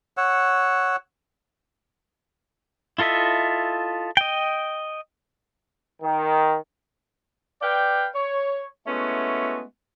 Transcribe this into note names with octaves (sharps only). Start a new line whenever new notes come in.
C#5 F#5 E6
E4 F4 A4 D#5 E5
D#5 G5
D#3
B4 D5 F5 G5
C#5
G#3 A3 B3 C#4 E4 F#4